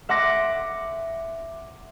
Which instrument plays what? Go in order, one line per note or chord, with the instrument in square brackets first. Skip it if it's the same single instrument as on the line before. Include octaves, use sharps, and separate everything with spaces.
[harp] E5 F#5 C6 D6 A#6